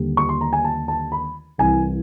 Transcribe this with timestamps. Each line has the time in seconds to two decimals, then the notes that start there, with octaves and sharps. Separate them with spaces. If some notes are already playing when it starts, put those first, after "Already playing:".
Already playing: D#2 D3 G3
0.17 C#6
0.29 C6
0.41 A#5
0.53 G#5
0.64 A5
0.88 A5
1.12 B5
1.58 C2 C3 E3 G#5